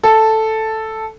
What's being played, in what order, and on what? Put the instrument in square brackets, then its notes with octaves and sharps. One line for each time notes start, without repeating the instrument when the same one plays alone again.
[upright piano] A4